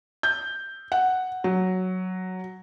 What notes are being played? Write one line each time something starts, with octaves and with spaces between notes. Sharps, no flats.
G6
F#5
F#3